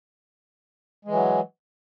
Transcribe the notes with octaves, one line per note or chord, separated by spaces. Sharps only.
E3 F#3 G#3